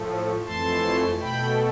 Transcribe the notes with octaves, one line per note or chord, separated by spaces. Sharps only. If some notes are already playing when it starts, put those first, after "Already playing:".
Already playing: A2 F3 A3
F2 E3 A3 A5 C6
B2 A3 G5 B5